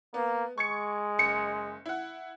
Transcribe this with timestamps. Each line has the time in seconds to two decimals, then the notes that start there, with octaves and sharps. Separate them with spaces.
0.14 A#3 B3
0.58 G#3 C#6 G#6 C#7
1.19 F#1 C#7
1.86 E4 F#5